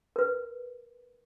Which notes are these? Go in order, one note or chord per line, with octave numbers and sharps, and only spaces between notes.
A#4 B4